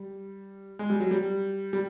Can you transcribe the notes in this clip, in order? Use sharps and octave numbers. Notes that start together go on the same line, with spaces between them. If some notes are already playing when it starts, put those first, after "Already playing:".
Already playing: G3
G#3
G3
F#3
G3
G3